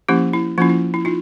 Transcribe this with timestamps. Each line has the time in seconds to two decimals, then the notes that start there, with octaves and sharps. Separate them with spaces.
0.09 F3 A#3 C#4 E4 G4
0.33 E4
0.58 F3 A#3 C#4 E4 F4
0.70 E4
0.94 E4
1.05 D#4 F4